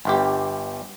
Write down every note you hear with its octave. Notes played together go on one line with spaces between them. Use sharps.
G1 G2 G4